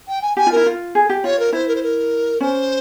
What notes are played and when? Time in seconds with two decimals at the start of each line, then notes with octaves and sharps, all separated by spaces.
0.08 G5
0.22 G#5
0.37 G4 G#5
0.47 F4
0.52 E4 A#4
0.66 F4
0.95 G#4
1.09 G4
1.24 F4 C#5
1.39 A#4
1.53 E4 C5
1.68 A#4
1.75 C5
1.83 A#4
2.40 C#4 C5